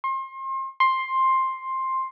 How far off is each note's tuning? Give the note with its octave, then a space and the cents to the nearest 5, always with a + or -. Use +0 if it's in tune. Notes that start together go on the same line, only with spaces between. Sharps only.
C6 +35
C6 +10